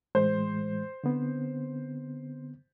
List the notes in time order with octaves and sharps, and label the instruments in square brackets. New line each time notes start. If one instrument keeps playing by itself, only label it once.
[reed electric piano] A2 E3 G#3 [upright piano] C5
[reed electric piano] D3 B3 C4